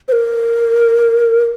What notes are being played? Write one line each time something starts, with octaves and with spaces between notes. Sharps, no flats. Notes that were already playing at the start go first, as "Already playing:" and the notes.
C5
A#4